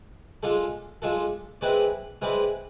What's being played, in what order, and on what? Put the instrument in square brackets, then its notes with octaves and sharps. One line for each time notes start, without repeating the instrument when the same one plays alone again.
[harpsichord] G#3 D4 F4 A4
G#3 D4 F4 A4
G#3 C4 E4 B4 D5
G#3 C4 E4 B4 D5